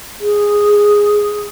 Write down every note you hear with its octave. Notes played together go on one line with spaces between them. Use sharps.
G#4